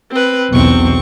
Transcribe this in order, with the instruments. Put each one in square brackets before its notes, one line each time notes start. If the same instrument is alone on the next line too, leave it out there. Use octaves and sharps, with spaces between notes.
[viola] C4 B4
[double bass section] B1 E2 B2 [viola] C4 C#6